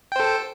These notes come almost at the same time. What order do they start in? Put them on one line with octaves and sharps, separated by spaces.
G5 C5 A4